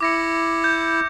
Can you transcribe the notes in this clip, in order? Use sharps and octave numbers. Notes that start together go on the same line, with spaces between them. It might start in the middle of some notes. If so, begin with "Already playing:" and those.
E4 D6 A#6 C#7
G6